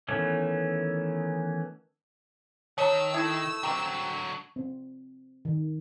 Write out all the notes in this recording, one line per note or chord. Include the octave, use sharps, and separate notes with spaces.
D#3 E3 A3 B3 C#4
D#3 C#5 A5 A#5 E6
A3 E4 D#6 G#6
D3 F#3 C4 G4 A#5 C#6
C4
D#3